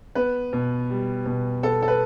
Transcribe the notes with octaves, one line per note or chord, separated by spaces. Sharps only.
B3 B4
B2
G3
B2
B3 A4
A4
B4